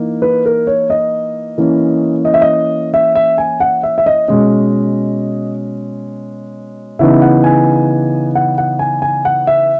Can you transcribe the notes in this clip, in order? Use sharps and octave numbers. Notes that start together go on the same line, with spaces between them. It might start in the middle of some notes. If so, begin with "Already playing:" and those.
Already playing: E3 A#3 D#4
B4
A#4
C#5
D#5
E3 A#3 C#4
D#5
E5
D#5
E5
E5
G#5
F#5
E5
E5
D#5
B2 G#3 C#4 D#5
C#3 E3 B3 D#4 E5
F#5
G#5
F#5
F#5
G#5
G#5
F#5
E5